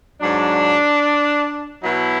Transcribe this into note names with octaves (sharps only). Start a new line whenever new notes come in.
G#2 F#3 D4
B2 F#3 E4